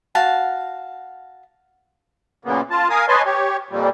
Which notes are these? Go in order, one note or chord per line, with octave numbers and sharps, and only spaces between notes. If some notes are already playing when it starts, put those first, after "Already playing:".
F#4 F5 A5
F#2 A#2 C#3 A#3 B3
F4 A5
A#4 F5 G#5 D#6
B4 C#5 D#5 G#5 A5 C6
G4 C#5
F2 A#2 G3